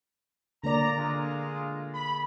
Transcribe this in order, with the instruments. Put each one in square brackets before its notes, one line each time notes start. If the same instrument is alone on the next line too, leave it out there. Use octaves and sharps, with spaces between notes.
[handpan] D3 A#3 D5 [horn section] A#5
[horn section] G#3 F4
B5